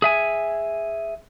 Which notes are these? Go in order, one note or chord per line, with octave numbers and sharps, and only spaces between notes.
G#4 E5 G#5